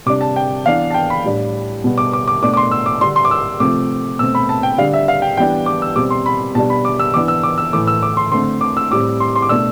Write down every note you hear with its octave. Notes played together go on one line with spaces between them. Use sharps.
C3 G3 D4 D6
A5
G5
E3 B3 D4 F5
A5
G5
B5
A2 G3 D4
B2 G3 B3
D6
D6
D6
B2 A3 D4 D6
D6
C6
E6
D6
D3 G3 D4 C6
C6
D6
E6
C3 F3 A3 C4 D6
B2 A3 C4 E6
B5
A5
G5
D3 G3 D4 F5
E5
F5
G5
E3 G3 B3 D4 G5
D6
E6
B2 G3 C4 D6
C6
B5
B2 G3 D4 A5
B5
D6
E6
E3 B3 D4 D6
E6
D6
E6
A2 E3 A3 D6
E6
D6
C6
D3 A3 C4 C6
D6
E6
A2 G3 C4 D6
C6
C6
D6
B2 A3 D4 E6